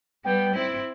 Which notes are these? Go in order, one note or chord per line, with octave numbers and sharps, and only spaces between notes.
G3 B3 G5
C4 E4